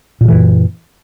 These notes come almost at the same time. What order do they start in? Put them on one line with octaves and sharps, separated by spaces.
A#2 D#3 E3 F#2